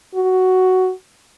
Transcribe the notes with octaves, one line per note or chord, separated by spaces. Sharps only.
F#4